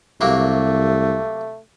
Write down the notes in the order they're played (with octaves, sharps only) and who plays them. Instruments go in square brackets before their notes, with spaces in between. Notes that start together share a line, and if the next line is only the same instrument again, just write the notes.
[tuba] C2 [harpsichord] C3 F#3 A#3 [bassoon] A3